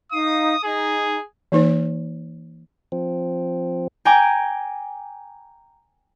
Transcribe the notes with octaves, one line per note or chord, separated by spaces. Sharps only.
D#4 F5 D#6
D#4 G#4
E3 A#3 D#4 C5
F3 C4
G5 G#5 A#5 D6